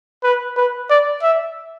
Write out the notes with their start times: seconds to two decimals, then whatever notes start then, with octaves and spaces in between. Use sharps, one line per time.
0.23 B4
0.57 B4
0.90 D5
1.22 E5